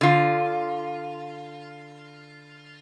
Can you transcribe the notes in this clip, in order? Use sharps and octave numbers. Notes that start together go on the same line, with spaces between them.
D3 F4